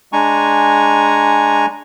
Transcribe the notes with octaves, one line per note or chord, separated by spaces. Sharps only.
G#3 D4 G#5 A#5 C#6